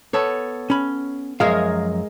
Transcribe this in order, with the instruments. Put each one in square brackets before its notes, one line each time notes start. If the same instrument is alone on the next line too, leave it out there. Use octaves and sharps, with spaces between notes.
[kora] B3 A4 C#5
[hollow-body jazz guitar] C#4 B5
[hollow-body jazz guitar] F#2 F3 F5 [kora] G#3 G#4 A#4